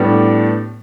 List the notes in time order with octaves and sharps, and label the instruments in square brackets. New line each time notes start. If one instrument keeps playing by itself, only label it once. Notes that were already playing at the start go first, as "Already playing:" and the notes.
Already playing: [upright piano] A2 G3 B3 D4